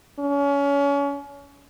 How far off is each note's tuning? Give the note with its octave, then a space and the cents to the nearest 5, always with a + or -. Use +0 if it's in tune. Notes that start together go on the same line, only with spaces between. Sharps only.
C#4 +30